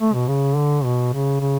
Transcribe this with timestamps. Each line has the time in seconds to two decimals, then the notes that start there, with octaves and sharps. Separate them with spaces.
0.01 A3
0.14 B2
0.28 C#3
0.56 D3
0.84 B2
1.13 C#3
1.40 C#3